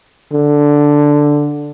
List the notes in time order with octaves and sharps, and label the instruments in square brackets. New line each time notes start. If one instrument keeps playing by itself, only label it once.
[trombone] D3